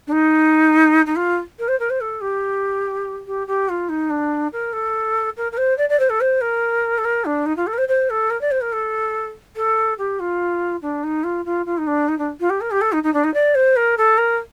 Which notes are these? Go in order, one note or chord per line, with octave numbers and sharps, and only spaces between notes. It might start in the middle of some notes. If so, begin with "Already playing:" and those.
D4
D#4
D#4
F4
A#4
C5
A#4
C5
A4
G4
G4
G4
F4
D#4
D4
A#4
A4
A#4
A#4
C5
D5
D5
C5
A4
C5
A#4
A4
A#4
D4
D#4
F4
A4
A#4
C5
C5
A4
A#4
D5
C5
A#4
A4
A4
G4
F4
D4
D#4
F4
F4
F4
D#4
D4
D#4
D4
F4
G4
A#4
G4
A4
D#4
D#4
D4
D#4
D5
C5
A#4
A4
A#4